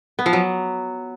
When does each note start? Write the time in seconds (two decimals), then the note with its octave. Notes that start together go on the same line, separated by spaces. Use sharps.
0.19 B3
0.26 F3
0.33 F#3